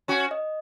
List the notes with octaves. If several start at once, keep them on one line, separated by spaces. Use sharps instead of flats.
C#4 F#4
D#5